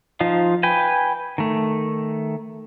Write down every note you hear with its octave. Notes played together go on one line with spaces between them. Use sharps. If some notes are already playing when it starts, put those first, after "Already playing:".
F3 D#4 F4
B4 G5 G#5
D#3 A3